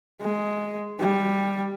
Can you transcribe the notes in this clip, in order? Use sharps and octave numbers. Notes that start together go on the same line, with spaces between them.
G#3
G3